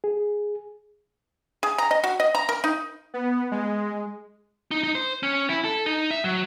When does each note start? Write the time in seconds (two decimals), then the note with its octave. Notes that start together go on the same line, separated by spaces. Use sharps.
0.04 G#4
1.63 G#4
1.78 A#5
1.91 D#5
2.04 F#4
2.20 D#5
2.35 A#5
2.49 A#4
2.64 D#4
3.14 B3
3.51 G#3
4.71 D#4
4.83 D#4
4.95 C5
5.23 C#4
5.49 E4
5.64 A4
5.86 D#4
6.11 E5
6.24 F#3